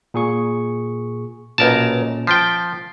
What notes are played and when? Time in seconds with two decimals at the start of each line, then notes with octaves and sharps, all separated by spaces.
0.14 A#2 G#4 C#6
1.58 B1 A#2 C#4 A#4 A5 A#6
2.27 F3 G5 A6 B6 C7